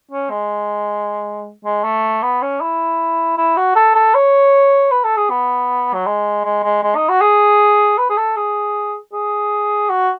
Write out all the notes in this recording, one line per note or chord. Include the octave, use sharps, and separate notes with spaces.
C#4
G#3
G#3
A3
B3
C#4
E4
E4
F#4
A4
A4
C#5
B4
A4
G#4
B3
F#3
G#3
G#3
G#3
G#3
D#4
F#4
G#4
B4
G#4
A4
G#4
G#4
F#4